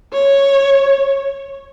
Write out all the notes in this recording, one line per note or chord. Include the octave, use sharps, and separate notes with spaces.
C#5